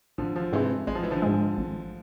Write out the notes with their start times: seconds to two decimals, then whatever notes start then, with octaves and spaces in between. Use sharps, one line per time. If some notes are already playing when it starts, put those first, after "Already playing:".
0.18 A1 D3 F3
0.36 D3 F3
0.53 G#2 C3 E3 G#3
0.87 A1 G#3
0.95 F3
1.03 E3
1.11 D3 F3
1.22 G#2 G#3
1.58 A1